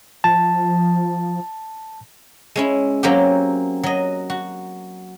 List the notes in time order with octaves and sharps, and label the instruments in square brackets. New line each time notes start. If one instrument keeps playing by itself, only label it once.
[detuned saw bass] F3 [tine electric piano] A5
[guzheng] G#3 C#4 E4
F#3 A#3 C4 C#4 G4
F#3 D#5
F#4